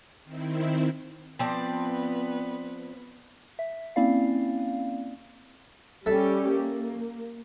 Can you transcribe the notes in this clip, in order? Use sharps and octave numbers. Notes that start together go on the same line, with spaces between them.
D#3 C4 E4
F3 B3 C4 B4 D5
E5
A#3 C4 C#4 E4 D5 F5
G3 C#4 G4 A4 E5 A5
A#3